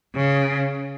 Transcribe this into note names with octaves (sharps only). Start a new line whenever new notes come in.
C#3